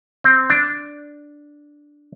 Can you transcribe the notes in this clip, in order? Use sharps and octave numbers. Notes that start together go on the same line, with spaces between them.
C4
D4